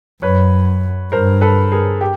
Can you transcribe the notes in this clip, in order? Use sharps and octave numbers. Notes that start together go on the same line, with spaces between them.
F#2 B4 C#5
G2 A#4 C5
A4 B4
G#4 A#4
G4